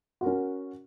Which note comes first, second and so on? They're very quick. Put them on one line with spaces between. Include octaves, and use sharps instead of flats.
F#4 A#4 C#4